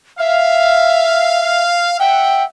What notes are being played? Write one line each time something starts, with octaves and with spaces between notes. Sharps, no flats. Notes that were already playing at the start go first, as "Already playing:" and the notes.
E5 F5
E5 F#5 G5